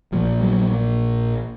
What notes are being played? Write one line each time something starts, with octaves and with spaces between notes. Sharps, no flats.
A#1 A#2 F3
F#3